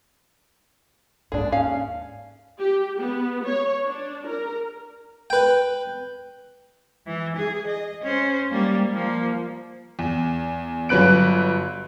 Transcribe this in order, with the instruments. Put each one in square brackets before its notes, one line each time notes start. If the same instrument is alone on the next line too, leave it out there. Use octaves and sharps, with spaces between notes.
[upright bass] D#2 G#2 [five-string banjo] D4 G#4
[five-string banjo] C#4 F5
[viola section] G4
B3
C#5
D4
A#4
[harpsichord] B4 G5
[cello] E3
G#4
D#5
C#4 C5
G3 A#3
F3 A#3
[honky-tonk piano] E2
G1 F#3 B4 F#6 D7